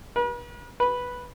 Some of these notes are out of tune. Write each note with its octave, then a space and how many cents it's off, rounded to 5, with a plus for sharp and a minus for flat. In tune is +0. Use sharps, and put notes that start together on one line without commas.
B4 -40
B4 -5